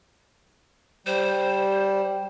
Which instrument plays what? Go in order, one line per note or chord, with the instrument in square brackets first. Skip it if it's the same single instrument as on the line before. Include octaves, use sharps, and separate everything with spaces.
[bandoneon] G3 [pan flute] C5